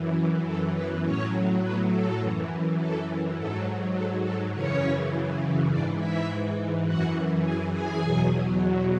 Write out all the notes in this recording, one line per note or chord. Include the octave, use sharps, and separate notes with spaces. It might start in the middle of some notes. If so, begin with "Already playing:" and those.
Already playing: F#2 E3
A4
B3 B4
A2 F#3 C#4 C#5
B3 B4
A4
F#2 E3
A4
G#2 F#3 A4
A4
A4
F#2 C#3 E3 C#4 C#5
G#2 E3 D4 D5
E4 E5
F#2 E3 F#4 F#5
G#4 G#5
G#4 G#5
E2 B2 F#3